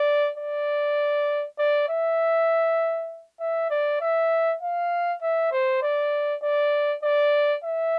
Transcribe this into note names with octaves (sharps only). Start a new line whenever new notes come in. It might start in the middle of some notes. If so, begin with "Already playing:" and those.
Already playing: D5
D5
D5
E5
E5
D5
E5
F5
E5
C5
D5
D5
D5
E5